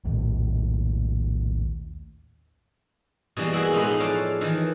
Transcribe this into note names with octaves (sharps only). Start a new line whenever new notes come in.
A#1 D#2 A2
B2 E3 G3 A#3
E4 G#4 E5 F#5 G5
A2 F3 G#3 D#4 F#5 B5
A4 B4 C#5 D5 F5 A5
D#3 E3